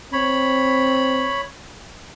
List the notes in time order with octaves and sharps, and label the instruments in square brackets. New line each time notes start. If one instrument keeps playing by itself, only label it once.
[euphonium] C4 [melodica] C#5 B5